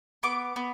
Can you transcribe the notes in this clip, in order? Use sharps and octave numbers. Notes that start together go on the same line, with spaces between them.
B3 D6
B3